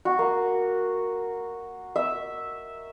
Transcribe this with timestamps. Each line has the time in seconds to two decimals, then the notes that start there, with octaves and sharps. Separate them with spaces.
0.05 F#4
0.19 A#3
1.96 E5